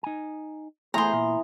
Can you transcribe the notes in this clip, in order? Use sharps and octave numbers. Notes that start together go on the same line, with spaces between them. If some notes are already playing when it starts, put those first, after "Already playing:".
D#4 G#5
E3 A3 B3 G#4 C5 A#5 C6
A#2